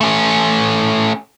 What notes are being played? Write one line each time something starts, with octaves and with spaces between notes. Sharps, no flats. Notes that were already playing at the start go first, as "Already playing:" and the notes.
A3 C#4